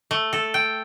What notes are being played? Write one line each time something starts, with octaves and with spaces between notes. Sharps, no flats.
A3
A4
G5